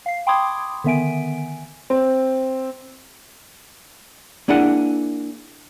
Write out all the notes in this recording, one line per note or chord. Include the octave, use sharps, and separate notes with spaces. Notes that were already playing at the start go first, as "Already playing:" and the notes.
F5 C7
G5 B5 C6 D6 D#6 G#6
D3 D#3 B3 E5 G#5 D7
C4
A#3 D4 E4 G#4 F#5